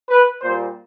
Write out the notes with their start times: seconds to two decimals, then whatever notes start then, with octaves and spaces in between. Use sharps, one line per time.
0.09 B4
0.42 A#2 G3 C5